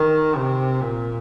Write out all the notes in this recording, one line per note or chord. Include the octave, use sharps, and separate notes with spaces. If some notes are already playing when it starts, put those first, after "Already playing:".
Already playing: D#3
C3
A#2